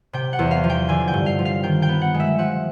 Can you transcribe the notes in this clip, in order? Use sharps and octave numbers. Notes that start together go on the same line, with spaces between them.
C3 G5
F#5
E2
F5
F3
G5
D3 G#5
G5
G2
F5
F3
F5
D#3 G5
G5
B3
F#5
G#3
E5
F3 F#5